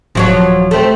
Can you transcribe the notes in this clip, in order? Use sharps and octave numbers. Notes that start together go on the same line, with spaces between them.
D#1 F3 F#3 C#5
A3 C4